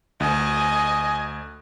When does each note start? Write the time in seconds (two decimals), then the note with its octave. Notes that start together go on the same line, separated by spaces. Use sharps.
0.20 D2 D#5 G#5